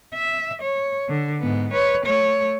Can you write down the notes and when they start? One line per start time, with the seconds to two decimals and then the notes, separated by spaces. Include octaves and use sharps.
0.14 E5
0.62 C#5
1.08 D3
1.40 G#2 B3
1.73 B4 C#5
2.06 A3 C#5